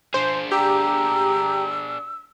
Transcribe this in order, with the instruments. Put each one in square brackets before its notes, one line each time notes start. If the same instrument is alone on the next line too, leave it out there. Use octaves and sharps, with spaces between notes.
[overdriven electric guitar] D4 G#4 [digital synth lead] C5
[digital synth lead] G4 [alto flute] A#5 [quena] E6